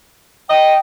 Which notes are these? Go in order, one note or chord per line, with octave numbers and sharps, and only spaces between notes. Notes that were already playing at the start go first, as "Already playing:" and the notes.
D#5 G5